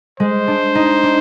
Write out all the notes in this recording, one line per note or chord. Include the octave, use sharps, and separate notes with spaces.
G#3 C5
D4
D#4
D4